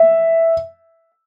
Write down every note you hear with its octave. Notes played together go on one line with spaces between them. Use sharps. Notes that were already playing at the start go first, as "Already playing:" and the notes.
Already playing: E5